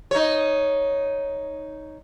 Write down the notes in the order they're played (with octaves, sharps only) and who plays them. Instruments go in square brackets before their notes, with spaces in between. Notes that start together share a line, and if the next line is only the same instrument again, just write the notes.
[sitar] D#4 C#5